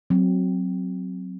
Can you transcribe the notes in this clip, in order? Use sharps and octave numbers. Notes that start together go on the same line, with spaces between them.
F#3 C4